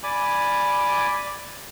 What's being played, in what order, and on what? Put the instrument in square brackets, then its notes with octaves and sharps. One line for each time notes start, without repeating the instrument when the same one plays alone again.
[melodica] D5 G#5 B5 D6